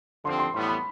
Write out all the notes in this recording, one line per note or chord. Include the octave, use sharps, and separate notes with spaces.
D3 F3 C4 G4 C6
C6
A2 E3 G3 B3 C6
B5